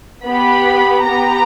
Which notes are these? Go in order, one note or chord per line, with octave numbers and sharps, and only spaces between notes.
B3 G4 B5
B3 G4 A#5